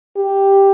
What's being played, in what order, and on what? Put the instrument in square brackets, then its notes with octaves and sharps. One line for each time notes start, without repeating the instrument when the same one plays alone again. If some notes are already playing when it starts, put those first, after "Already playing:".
[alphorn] G4